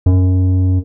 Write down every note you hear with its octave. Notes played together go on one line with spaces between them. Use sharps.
F#2